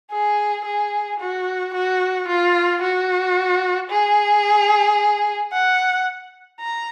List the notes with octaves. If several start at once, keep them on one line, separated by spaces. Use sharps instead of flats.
G#4
G#4
F#4
F#4
F4
F#4
G#4
F#5
A#5